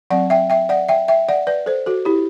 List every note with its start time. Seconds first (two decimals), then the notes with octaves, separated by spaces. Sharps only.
0.10 F#3 C4 D5 F#5
0.30 E5 G5
0.50 E5 G5
0.69 D5 F#5
0.89 E5 G5
1.08 E5 G5
1.29 D5 F#5
1.47 B4 D5
1.66 A4 C5
1.86 F#4 A4
2.05 E4 G4